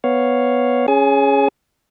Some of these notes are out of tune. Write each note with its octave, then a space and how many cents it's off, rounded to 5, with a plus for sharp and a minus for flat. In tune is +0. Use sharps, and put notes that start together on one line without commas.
B3 +0 C#5 +0 F5 +0
C#4 +0 G#4 +0 G#5 +40